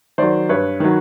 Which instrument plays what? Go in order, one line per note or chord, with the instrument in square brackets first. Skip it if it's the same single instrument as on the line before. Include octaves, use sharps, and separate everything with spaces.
[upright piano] D#3 F#3 C5 D5
G2 B4 C#5
D#3 F#3